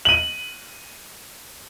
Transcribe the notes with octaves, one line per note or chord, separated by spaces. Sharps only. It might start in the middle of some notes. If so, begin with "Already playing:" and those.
D#7 F#7